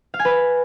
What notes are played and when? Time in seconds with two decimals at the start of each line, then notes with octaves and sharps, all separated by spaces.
0.14 F5
0.19 G#5
0.25 B4